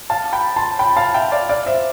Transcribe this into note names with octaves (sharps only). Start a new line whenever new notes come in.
F5 A5
G5 B5
A5 C6
G5 B5
F5 A5
E5 G5
D5 F5
D5 F5
C5 E5